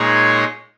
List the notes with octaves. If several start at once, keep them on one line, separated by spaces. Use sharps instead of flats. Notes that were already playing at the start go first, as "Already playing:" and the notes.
Already playing: A#2 G#3 D#4 G#4 C#5